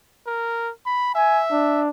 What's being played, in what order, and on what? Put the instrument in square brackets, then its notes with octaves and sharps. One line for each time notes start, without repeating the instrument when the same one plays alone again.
[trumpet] A#4
B5
[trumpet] E5 [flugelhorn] G#5
[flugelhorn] D4